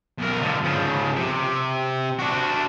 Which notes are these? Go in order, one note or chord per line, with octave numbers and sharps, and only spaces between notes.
B1 A#4
D3 F3
C#3 F3
C3
D4 F#4